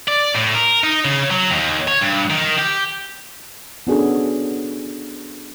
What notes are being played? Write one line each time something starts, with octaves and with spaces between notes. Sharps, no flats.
D5
A2
A#4
D#4
C#3
F#3
D#2
C#5
G2
D#3
G4
B3 C#4 D4 F#4 G#4 A4